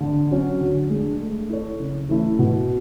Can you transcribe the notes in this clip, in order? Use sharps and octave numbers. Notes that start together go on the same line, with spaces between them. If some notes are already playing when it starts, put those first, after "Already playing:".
D3
F#3 C#4 F#4
D3
G#3 D4
A3
E4 A4 C#5
C#3
E3 A3 C#4 E4
B2